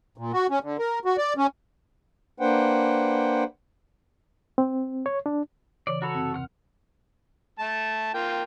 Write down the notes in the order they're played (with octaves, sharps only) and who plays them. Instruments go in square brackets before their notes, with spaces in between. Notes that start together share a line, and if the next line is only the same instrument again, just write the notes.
[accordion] A#2
F#4
C#4
D3
A#4
F#4
D5
C#4
[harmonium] A#3 D4 B4 C5 F#5 G5
[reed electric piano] C4
C#5
D4
[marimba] C#3 E3 C#5 [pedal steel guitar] D5
[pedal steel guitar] F#4 A4 C#5 [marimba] A#5 B5
[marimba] F#2 C3 C4
[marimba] D#2 C3 [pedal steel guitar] F#5 F6
[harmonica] A3 A5
A#3 F4 G5